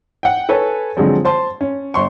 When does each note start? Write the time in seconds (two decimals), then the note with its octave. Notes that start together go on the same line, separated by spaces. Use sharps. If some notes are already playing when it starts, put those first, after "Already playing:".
0.23 F#5 G5
0.49 A4 B4 C#5 G#5
0.97 D3 F3 F#3 G#3 C4
1.25 C5 A5 C6
1.61 C#4
1.94 G1 C6 C#6